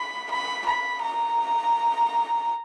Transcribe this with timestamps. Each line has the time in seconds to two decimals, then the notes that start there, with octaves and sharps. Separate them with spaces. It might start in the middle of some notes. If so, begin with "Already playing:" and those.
Already playing: B5
0.31 B5
0.66 B5
1.02 A#5